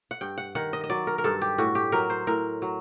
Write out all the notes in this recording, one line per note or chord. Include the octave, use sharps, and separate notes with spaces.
F#5
G2 G5
F#5
D#3 F#5
D#5
D#5
F#3 D5
A#4
A#4
G2 A4
G4
A2 F#4
G4
F#3 A#4
C5
A2 A#4
F#3